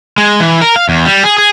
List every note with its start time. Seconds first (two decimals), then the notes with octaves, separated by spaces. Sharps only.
0.18 G#3
0.40 E3
0.61 A#4
0.76 F5
0.89 E2
1.05 G3
1.24 G#4
1.38 G#4